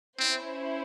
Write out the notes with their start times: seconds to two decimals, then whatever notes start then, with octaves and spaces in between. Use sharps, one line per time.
0.19 C4 C#4 E4 C5